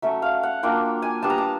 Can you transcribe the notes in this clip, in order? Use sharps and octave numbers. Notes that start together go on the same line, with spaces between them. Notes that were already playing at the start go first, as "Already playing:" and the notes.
F#3 A3 C#4 E5
F5
F#5
F#3 A#3 D4 F4 G5
G#5
G3 B3 D4 A5
A#5
A5